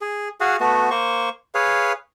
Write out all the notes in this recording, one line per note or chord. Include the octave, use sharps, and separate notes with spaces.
G#4
F#4 G#4 F5 F#5
A3 B3 F#4
A#3 C5 C#6
G#4 B4 C#5 F5